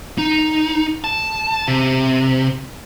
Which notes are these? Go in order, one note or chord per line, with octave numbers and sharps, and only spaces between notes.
D#4
A5
C3